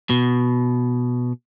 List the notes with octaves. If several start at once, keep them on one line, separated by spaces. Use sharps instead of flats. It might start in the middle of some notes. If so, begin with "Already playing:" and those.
B2